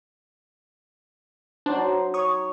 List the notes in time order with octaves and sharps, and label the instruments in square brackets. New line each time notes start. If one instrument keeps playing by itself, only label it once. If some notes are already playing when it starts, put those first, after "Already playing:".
[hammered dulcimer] F#3 D#4 [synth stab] D4 [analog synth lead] C5
[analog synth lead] C#5 [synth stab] C#6 D#6